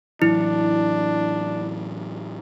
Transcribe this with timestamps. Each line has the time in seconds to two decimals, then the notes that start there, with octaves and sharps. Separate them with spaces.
0.22 A2 E3 F#3 D4 E4